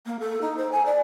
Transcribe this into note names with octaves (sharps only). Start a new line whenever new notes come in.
A#3
A4
D#4
C5
G#5
D5